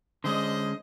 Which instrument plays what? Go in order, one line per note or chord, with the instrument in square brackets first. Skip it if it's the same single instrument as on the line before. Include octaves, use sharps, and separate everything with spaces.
[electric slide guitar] D3 G#3 C#4 [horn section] C5 D5 D#5